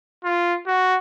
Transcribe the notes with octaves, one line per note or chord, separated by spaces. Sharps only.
F4
F#4